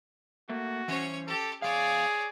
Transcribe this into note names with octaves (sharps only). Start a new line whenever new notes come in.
A3 A#3 F#4
E3 C#4 C5 C#5
G4 A4 A5
E2 E3 G#4 C#5 D5 F5